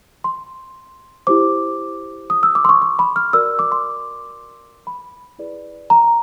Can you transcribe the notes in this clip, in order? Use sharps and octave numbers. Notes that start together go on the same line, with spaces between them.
C6
E4 G4 C5 D6
D#6
E6
D6
C6
C#6
C6
B5
F6
F#4 A#4 D5 E6
D6
C6
B5
E4 G#4 B4 D5
A#5